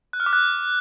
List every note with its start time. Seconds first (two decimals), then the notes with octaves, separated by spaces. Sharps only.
0.13 F#6
0.20 F6
0.26 D6
0.33 F#6